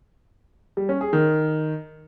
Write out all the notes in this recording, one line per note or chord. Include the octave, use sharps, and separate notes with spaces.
G3
C#4
G#4
D#3